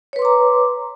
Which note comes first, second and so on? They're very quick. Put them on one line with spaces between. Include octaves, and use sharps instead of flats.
C#5 B4 C6 D6 A#5